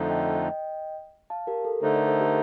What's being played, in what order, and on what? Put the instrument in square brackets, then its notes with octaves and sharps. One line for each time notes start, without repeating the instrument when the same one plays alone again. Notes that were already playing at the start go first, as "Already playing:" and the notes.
Already playing: [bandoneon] F2 D3 F3 A3 D#4
[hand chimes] D#5 G5
F5 A5
G4 A#4
A4
[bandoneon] D3 A3 D#4 [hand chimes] A4 C5
[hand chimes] A#4 D5
A4 C5
G4 A#4